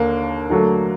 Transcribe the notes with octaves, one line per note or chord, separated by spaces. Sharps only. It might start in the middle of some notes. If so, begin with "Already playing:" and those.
Already playing: D#2 D3 A#3
D3 F#3 A3